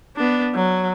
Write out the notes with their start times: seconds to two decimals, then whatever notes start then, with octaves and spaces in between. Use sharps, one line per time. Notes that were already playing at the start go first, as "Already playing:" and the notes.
0.16 B3 D4
0.55 F#3